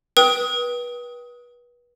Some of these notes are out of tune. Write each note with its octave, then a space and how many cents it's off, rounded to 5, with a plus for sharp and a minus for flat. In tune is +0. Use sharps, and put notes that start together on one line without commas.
B4 -30 G5 +0 D#6 +20